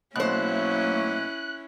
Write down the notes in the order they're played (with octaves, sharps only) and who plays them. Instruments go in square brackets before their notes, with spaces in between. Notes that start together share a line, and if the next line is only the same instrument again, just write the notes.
[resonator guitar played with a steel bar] B2 C5 [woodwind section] F#3 A3 A#3 [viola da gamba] C#4 E4 [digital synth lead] F#6